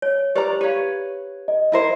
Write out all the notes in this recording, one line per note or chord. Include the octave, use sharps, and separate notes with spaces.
C#5
G4 B4 C5 D5 A#5
G4 B4 C#5 F5
D#5
E4 A#4 C5